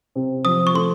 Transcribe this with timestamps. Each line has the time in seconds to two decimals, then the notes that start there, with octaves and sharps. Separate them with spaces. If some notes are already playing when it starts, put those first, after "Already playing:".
0.16 C3
0.45 F3 D#6
0.67 C#6
0.74 A3 C6